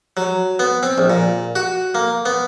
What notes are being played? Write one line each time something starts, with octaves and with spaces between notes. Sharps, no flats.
F#3
B3
C4
A#1
A#2
F#4
A#3
B3